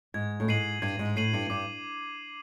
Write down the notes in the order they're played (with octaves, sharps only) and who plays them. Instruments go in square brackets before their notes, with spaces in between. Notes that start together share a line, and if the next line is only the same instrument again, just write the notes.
[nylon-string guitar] G#2 [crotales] G#6
[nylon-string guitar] A2
[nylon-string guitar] G#2 [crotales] C7 D#7 F#7
[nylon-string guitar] G2 [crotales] G#6
[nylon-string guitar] G#2
[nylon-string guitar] A2 [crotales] C7 D#7 F#7
[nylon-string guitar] G2
[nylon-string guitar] G2 [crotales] D6